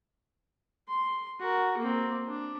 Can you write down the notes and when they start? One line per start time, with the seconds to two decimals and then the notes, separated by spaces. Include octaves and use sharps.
0.88 C6
1.40 F#4 A#4
1.78 A#3 C4
2.27 D4